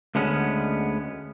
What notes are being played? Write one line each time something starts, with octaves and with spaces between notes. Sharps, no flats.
D2 D3 G#3 B3 C#4